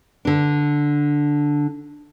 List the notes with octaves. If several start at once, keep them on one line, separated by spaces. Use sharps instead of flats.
D3 D4